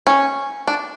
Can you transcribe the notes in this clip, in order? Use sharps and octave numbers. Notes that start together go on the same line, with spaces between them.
C#4
D4